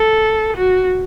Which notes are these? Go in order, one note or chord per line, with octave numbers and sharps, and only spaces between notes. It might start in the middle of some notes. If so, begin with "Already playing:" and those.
Already playing: A4
F#4